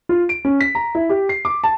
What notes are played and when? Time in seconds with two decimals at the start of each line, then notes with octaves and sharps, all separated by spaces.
0.09 F4
0.29 D7
0.45 C#4
0.60 B6
0.75 A#5
0.95 E4
1.09 G4
1.29 C7
1.45 D6
1.64 A5